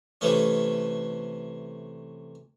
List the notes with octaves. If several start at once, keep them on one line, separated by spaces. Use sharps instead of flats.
C3 E3 A3 C#4